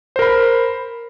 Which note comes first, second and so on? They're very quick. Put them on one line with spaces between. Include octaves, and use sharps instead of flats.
C5 A#4 B5